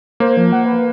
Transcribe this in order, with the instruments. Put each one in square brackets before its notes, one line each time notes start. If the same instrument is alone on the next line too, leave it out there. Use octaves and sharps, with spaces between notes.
[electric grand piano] A#3 [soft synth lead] C5
[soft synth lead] F3
F#5
B4